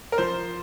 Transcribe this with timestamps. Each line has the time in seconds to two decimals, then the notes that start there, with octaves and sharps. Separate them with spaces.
0.12 A#4
0.18 F3 C5